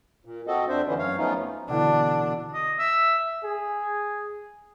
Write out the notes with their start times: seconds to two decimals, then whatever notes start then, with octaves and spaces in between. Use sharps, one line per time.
0.25 A#2
0.47 C4 F#4 A4 D#5
0.68 F2 C4 D4 C5 E5
0.87 D3 E3 A3 B3 C#4 D4
0.99 F#2 C#5 F5
1.18 F3 A3 B3 C#4 D#4 F4
1.70 B2 D3 E3 D4
2.54 D#5
2.79 E5
3.44 G#4